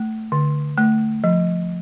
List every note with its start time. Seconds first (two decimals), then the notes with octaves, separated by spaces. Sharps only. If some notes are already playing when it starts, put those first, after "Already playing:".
Already playing: A3
0.32 D3
0.77 A3
1.24 F3